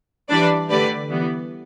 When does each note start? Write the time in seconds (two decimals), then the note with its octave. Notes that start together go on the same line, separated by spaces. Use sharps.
0.29 E3 G3 D4 B4 D5
0.70 D3 A3 G4 B4 D5
1.10 E3 G3 B3